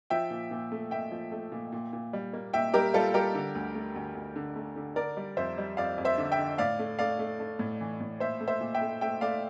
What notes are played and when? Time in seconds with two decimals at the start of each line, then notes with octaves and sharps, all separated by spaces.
0.10 F3 E5 G5
0.30 A#2
0.51 A#2
0.72 A3
0.91 A#2 E5 G5
1.12 F3
1.32 A3
1.52 A#2
1.72 A#2
1.93 A#2
2.13 G3
2.33 A#3
2.53 A#2 E5 G5
2.74 G3 G4 A#4
2.94 G3 F4 A4
3.14 G3 G4 A#4
3.35 D3
3.55 D2
3.75 A3
3.96 D2
4.15 D2
4.36 D3
4.56 A3
4.76 D3
4.96 D3 A#4 D5
5.17 G3
5.37 F2 C5 E5
5.58 G3
5.77 F2 D5 F5
5.98 F2
6.05 C5 E5
6.18 D3
6.32 E5 G5
6.38 D3
6.58 A2 D5 F5
6.79 A3
6.99 A3 D5 F5
7.19 A3
7.40 A3
7.59 A2
7.80 E3
8.00 A2
8.20 A#2 C5 E5
8.40 A3
8.48 C5 E5
8.60 A#2
8.74 E5 G5
8.81 A3
9.01 A3 E5 G5
9.21 A3 D5 F5